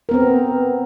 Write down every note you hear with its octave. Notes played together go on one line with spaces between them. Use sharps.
B3 C4 A#4